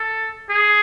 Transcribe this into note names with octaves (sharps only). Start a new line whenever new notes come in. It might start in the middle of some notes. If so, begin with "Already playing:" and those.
Already playing: A4
G#4